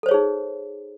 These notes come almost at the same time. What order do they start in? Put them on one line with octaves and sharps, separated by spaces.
A4 C5 C#5 G#4 D#4